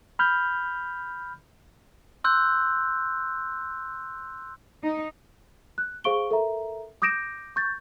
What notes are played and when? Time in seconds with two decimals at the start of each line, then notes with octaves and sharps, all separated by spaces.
0.19 B5 F6 G6
2.24 C6 E6 F#6 G6
4.83 D#4
5.78 F#6
6.04 G#4 C5 F5 C#6 D7 G7
6.31 A4 A#4 E5 A#5
7.02 D6 D#6 G6 A#6 D7 E7
7.56 C#6 G6 A6